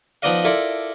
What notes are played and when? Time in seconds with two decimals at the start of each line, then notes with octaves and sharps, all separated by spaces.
0.22 F3 B3 D#4 D5 D#5 F5
0.44 E4 F4 A4 A#4 D5